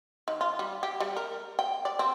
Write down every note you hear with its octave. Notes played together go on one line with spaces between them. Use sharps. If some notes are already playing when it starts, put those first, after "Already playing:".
D#3
F4
G3
G4
G3
A#4
G5
D5
C4